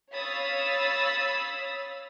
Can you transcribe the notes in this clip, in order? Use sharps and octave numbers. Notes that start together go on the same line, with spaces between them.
C#5 F5 B5 D#6 E6 A6